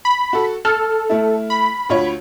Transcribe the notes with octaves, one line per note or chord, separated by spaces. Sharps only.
B5
F#4 A4
A4 F6
A3 E4
B5
D2 F4 C#5